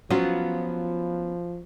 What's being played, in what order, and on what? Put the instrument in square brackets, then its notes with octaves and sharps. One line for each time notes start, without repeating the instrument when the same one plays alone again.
[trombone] F3 [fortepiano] F#3 [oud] B3 C#4 F4